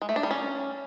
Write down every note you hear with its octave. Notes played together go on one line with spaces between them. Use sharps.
G#3
A3
D4
G3
C#4